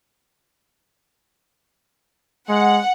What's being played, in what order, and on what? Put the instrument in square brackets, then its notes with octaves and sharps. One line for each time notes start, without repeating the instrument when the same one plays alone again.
[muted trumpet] G#3 [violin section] F#5